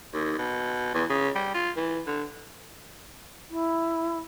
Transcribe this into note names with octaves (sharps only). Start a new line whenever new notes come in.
D#2
B2
E2
C#3
G3
F4
E3
D3
E4